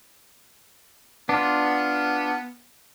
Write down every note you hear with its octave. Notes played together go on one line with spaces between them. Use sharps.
B3 D4 F4